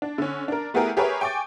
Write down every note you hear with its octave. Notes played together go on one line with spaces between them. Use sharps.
D4
D3 C#4
D4 A#4
A3 B3 E4 G4 G#4 A#4
G4 G#4 A#4 B4 C#5 E5
G5 G#5 C#6 D6 A6